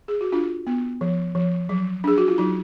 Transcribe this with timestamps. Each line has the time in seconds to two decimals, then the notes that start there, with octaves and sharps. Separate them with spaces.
0.08 G#4
0.21 F#4
0.32 D4 F4
0.67 B3
1.01 F3
1.35 F3
1.69 F#3
2.04 D4 G#4
2.18 F#4
2.28 F4
2.38 F#3 D#4